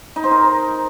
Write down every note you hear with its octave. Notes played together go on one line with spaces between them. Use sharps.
D#4
C5
A#4